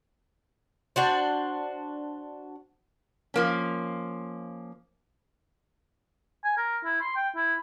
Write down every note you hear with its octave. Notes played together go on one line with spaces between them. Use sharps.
D4 F#4 C5
F3 A#3 C#4
G#5
A#4
E4
C6
G5
E4